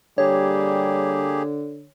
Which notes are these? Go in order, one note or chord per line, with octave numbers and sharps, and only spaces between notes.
D3 G3 A#3 G4 G#4 C#5